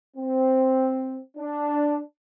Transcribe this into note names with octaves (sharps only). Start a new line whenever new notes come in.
C4
D4